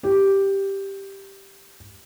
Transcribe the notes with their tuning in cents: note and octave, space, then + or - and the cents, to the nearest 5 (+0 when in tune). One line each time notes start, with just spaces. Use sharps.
G4 +0